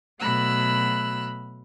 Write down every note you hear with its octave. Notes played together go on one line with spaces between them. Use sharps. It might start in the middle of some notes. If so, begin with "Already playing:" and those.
B2 F#3 A3 B5 E6 F#6